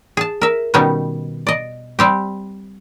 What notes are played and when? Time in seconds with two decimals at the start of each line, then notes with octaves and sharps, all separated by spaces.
0.17 G#4 A5
0.41 A#4 E5
0.74 B2 D#3 G3 B3 C#4 D#4
1.47 D5 D#5
1.99 G3 C4 G4